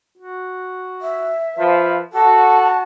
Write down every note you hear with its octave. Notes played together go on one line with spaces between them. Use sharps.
F#4
E5
F3 B4
F#4 A4 A5